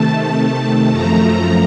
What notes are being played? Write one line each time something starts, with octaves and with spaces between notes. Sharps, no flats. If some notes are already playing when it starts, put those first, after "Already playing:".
Already playing: C3 D#3 A3 A5
F#2 F3 A3 A#5